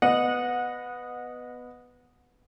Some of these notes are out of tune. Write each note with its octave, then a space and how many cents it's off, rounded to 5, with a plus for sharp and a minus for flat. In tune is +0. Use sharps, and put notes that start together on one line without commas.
B3 +10 D#5 -10 F#5 -25